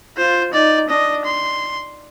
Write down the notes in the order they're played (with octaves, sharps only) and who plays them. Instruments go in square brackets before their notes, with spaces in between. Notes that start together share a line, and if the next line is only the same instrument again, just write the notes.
[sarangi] F4 [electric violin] C5
[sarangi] D#4 [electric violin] D5
[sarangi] D4 [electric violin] D#5
[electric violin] C6